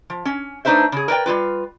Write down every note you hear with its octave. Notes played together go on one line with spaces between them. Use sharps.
F3
C#4
A3 D4 D#4 B4 C5 E5
C#3 G#4
A#4 B4 D5 G5
G3 G#3 F4 B4